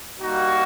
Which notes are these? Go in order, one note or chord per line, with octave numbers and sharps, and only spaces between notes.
G3 A#3 D#4 F#4